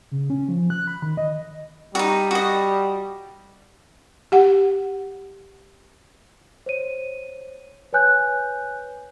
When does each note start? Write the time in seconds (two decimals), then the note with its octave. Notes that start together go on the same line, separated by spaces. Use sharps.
0.12 C#3
0.30 C#4
0.49 F3
0.70 F#6
0.87 B5
1.02 D#3
1.17 D#5
1.95 G3 D#4 F#4
2.31 F#4 D#5
4.32 G4 F#5
6.66 C5 C#5 D#7
7.93 B4 C#5 G#5 F#6 G6